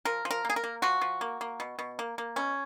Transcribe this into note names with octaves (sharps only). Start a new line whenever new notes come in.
F3 A#4
F3
A#4
A#3 G#4
A#4
A#3
F3 F#4
F3
A#3
A#3
B2
B2
A#3
A#3
B2 C#4